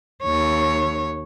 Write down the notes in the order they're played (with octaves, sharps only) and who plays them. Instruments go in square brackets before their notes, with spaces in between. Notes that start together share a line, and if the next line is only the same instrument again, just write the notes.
[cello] D#2 C#5